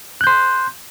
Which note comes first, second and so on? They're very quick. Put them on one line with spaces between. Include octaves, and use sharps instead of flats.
F#6 G6 C6